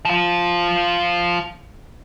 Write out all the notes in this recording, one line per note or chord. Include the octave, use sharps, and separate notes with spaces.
F3 F4